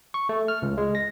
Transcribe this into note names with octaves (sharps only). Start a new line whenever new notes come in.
C#6
A3
F6
C#2
G#3
A#6